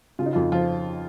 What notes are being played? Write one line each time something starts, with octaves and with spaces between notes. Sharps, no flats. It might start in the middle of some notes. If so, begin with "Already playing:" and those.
C#3 F4
D#4
F2 F4
F3 F4